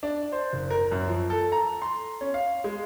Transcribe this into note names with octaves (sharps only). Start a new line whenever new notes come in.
D4
C5
F#1
A#4
F#2
F3
A4
A#5
C6
C#4
F5
G#3